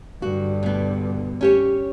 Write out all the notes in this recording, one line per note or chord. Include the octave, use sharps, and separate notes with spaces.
G2 D3 F#4
B2 B3
C#4 G4 C#5